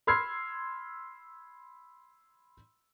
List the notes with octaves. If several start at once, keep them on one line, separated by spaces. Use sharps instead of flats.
B5 C6 E6 F6 G#6 C7